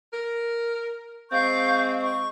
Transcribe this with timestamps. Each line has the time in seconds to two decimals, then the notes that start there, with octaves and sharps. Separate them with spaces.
0.13 A#4
1.32 G#3 C4 F5 C#6 G6
2.02 C#6